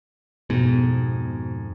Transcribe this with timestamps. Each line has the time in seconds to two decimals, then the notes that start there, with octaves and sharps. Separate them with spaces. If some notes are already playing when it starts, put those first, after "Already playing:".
0.50 F2 G#2 B2